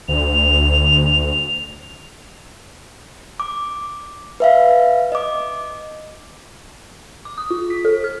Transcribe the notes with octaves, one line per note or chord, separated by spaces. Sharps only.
D2 F7
D6
B4 E5 F5
D#5 D6
D6
D#6
F4
B6
A4
F6